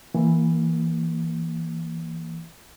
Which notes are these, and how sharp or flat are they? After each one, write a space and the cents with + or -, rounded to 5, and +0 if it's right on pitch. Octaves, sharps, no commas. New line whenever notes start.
E3 +0 A#3 +0